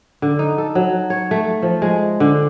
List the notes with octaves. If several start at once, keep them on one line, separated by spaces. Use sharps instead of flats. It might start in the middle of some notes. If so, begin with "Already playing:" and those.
D3
D#4
A4
F#3
C#5
A3
F3
G#3
D3